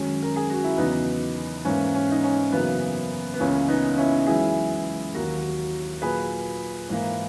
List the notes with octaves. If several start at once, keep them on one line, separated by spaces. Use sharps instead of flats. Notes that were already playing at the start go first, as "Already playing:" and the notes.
Already playing: F#2 D#3 G#3 C#4
A#4
G#4
F#4
E4
E2 C#3 F#3 B3 D#4
G#2 E3 A#3 C#4
C#4
D#4
C#4
F#2 C#3 E3 A#3 B3
B3
C#2 C#3 E3 A#3 C#4
B3 D#4
C#4 E4
F#2 E3 G#3 E4 G#4
D#2 D#3 F#3 A#3 F#4 A#4
A#2 F#3 A#3 G#4 B4
G#2 E3 A#3